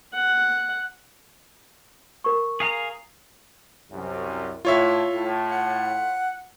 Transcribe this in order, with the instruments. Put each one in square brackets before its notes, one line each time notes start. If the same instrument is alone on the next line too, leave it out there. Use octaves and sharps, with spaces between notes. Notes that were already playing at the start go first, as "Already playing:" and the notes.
[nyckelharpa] F#5
[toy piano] A#4 B5 C#6
[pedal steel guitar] G#4 F5 A#5
[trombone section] C2 F#2
[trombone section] A2 [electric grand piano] F4 C#5 E5
[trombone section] A2
[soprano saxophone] F#5